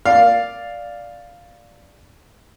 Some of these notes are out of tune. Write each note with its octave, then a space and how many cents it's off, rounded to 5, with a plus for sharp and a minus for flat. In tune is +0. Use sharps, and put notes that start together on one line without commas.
D5 +0 F5 +0